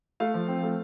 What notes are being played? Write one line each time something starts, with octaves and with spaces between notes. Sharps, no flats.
A3 F5
F3
C4
A3